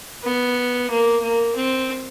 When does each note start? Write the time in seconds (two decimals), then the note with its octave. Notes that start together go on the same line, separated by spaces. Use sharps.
0.24 B3
0.90 A#3
1.22 A#3
1.56 C4